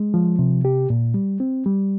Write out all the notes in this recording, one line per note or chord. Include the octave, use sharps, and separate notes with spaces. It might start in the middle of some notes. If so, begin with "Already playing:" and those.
Already playing: G#3
F3
C3
G4
A#2
G3
C4
G3